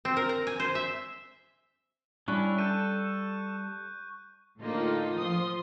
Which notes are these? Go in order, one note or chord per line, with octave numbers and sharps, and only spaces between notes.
C4
A#4
A#5
G#5
C5
E5
G3 C#4 D4 E4 C#6 F#6
A4 G6 D#7
A2 D3 A#3 D#4 F4 A4
F3 F4 C6 D#6